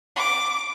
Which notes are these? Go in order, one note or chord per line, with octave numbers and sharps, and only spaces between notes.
D6